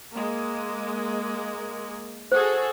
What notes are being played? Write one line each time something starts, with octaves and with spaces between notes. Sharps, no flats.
G#3 A#3
F#4 G#4 A4 C5